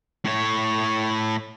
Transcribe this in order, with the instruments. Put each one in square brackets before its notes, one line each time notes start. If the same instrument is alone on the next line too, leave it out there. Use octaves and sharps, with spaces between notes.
[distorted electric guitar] A2 C#5